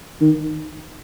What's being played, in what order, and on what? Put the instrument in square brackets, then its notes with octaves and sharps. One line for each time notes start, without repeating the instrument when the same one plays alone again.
[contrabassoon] D#3